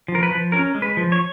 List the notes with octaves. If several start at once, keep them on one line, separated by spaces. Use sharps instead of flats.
F3
A#4
B4
F3
C#4 A#4
G#3
B4
F3
C#5